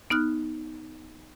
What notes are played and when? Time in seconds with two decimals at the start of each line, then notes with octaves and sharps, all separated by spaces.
0.10 B3 D#4 F6 F#6